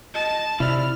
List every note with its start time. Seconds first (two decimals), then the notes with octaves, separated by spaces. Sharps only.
0.14 D#5 A5
0.60 C3 E4 D5 F6